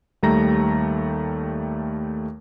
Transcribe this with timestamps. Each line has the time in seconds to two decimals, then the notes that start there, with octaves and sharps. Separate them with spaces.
0.23 D#2 G3 A3 A#5 A#6